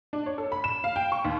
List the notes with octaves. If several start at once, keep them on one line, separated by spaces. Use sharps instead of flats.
D4
C#5
A4
B5
E7
F5
G5
C#6
D#2